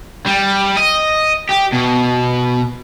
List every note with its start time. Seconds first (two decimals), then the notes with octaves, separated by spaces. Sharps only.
0.26 G3
0.77 D#5
1.50 G4
1.73 B2